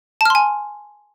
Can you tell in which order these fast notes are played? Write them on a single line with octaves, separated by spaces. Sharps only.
A5 F6 C6 G#5